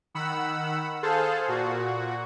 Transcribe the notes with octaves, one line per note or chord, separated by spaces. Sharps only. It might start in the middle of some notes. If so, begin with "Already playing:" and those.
D#3 F#5 B5 E6
G#4 A4 C5 F5 A5
A#2 F#4